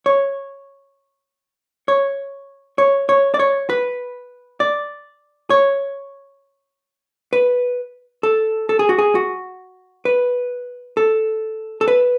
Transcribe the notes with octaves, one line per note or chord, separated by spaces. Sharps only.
C#5
C#5
C#5
C#5
D5
C#5
B4
D5
C#5
B4
A4
A4
G#4
F#4
G#4
F#4
B4
A4
A4
B4